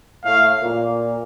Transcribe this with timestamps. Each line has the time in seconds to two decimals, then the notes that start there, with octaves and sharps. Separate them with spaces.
0.24 A2 A3 F5
0.61 A#2 A#3